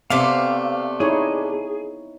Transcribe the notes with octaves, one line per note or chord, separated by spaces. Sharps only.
C3 A3 B3 C4 D4 F5
D#4 E4 G#4 C#5